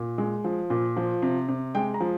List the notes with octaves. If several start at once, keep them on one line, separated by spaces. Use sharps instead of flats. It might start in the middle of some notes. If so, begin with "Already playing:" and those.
Already playing: A#2
G#3
F3
A#2
F3
C3
C3
G#3 G5
A#5
F3